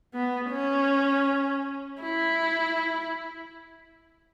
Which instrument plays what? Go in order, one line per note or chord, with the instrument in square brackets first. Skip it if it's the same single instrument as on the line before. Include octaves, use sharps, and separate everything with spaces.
[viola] B3
C#4
E4